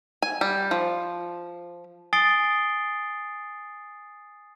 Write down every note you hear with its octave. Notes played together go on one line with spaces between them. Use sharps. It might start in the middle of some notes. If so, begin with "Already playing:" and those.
G#5
G3
F3
G#5 D#6 A6 C7 D7 G7